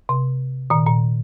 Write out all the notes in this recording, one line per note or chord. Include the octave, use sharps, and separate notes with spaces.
C3
A#2 D#3
A#2